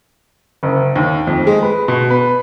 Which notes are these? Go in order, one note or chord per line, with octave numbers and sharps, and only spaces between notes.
F#1
D#2
F2
G#3
B4
B2
B4